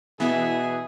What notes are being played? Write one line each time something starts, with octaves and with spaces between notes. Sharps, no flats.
B2 E3 B3 G#4 E5